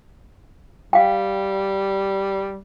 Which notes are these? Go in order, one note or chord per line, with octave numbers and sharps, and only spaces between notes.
G3 F5 G5